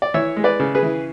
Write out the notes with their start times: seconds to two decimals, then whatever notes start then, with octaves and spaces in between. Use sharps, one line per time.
0.02 D5
0.14 E3 C#5 E5
0.36 G#3
0.44 B4 D5
0.60 C#3
0.75 G#4 B4
0.83 E3